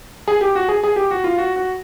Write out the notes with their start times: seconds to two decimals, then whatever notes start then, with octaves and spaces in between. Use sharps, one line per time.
0.28 G#4
0.41 G4
0.55 F#4
0.69 G#4
0.84 G#4
0.96 G4
1.11 F#4
1.24 F4
1.38 F#4
1.56 F#4